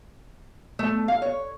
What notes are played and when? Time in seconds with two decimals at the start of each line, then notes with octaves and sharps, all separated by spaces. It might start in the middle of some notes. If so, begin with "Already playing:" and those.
0.79 A3
1.08 F5
1.22 C#5